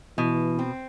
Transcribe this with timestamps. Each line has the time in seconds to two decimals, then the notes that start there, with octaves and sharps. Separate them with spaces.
0.18 B2 E3
0.59 C4